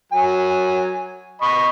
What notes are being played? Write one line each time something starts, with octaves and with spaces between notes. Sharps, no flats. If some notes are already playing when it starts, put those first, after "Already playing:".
F#3 G#5
D#5 B5 C#6